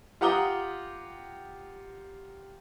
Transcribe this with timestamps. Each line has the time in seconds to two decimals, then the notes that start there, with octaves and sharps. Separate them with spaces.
0.21 F4 G4 F#5 A#5 D#6 G7